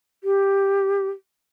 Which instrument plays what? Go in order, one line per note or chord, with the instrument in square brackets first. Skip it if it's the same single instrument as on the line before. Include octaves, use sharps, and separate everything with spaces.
[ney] G4